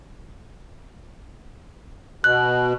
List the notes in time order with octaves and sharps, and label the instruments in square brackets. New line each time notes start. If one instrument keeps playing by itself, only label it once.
[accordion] B2 [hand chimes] F#6